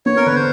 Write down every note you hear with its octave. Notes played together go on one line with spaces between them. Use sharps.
B3 C#5
A#4
D3 B4
C5